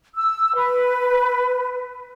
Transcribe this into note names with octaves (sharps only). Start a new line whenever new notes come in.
E6
B4